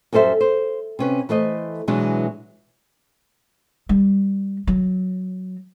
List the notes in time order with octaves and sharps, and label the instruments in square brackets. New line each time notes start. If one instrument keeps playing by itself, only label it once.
[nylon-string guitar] F#2 G3 A4 C5 E5
C5
C3 C#4 B4
E3 A3 C5 D#5
B2 E3 F#3 G#3 D4
[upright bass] G3
F#3